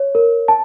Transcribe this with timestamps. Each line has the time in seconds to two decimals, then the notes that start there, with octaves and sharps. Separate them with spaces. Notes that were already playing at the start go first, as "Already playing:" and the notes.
Already playing: C#5
0.15 A#4
0.48 A5